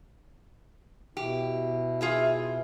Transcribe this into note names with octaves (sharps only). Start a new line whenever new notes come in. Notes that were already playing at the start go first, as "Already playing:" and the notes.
B2 E4 G4
F4 G#4 E5